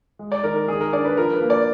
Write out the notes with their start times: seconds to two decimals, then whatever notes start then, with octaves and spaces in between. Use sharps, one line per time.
0.19 G#3
0.32 D5
0.44 D#3 A#4
0.56 A#4
0.68 D#3 G#4
0.81 A#4
0.93 D4 D5
1.05 B4
1.17 F3 A#4
1.33 B4
1.41 A#3
1.50 D5